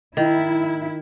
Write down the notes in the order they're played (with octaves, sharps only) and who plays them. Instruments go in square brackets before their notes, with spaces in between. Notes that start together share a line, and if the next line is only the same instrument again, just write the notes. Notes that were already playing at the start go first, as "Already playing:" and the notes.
[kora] D#3 [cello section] E4